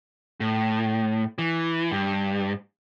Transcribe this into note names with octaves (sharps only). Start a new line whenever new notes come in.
A2
E3
G2